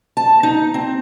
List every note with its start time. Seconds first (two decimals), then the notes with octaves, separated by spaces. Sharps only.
0.17 A5
0.43 D#4
0.74 C4